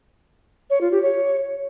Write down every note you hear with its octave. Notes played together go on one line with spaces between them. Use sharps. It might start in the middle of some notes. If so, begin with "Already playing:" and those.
C#5
F4
G4
C#5